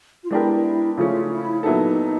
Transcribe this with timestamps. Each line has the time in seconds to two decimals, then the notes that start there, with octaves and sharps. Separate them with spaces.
0.23 F4
0.31 G#3 B3 D4 E4 G4 A#4
0.97 C#3 F3 A3 C#4 F4
1.24 D#4
1.31 E4
1.63 A#2 F#3 B3 D#4 E4 A4